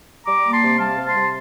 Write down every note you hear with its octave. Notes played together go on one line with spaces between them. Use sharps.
G3 A#5 D6
A#3
A5 C6
C3
G3 F5 A5
C3
A5 C6
C3